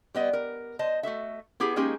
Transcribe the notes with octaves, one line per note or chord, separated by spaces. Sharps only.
G3 B3 D#5
A#4
C5 D#5 A5
A3 F#4 A4 E5
B3 E4 G4 G#4
G#3 A#3 C#4 D#4 G4 G#4